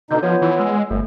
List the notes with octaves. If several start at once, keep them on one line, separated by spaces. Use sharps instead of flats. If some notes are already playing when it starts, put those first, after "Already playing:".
B2 D3 D#4 G6
F3 B3 F4 C#5
E3
G#3 E6
G1 A3